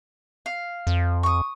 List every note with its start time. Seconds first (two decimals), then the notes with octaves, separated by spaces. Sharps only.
0.46 F5
0.87 F2
1.23 C#6 D#6